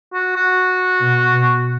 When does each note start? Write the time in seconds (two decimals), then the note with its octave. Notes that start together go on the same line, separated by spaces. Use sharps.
0.13 F#4
0.36 F#4
1.00 B2
1.33 B2